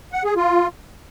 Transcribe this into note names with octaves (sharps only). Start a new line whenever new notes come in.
F#5
G#4
F4